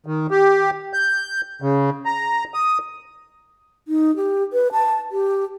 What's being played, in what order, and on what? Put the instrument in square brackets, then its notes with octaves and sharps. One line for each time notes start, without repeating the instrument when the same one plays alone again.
[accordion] D#3
G4
G6
C#3
A#5
D#6
[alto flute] D#4
G4
B4
A5
G4